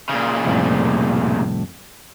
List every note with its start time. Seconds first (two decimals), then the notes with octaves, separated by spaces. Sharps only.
0.09 A#2 C#3
0.45 C2 F2 A2